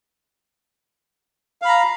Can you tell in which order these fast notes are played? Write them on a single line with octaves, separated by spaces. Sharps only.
F5 B5 A#5